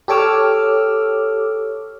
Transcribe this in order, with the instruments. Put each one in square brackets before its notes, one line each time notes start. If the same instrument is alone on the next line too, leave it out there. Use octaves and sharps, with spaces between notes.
[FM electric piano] G4 A4 C#5 D6 E6 F6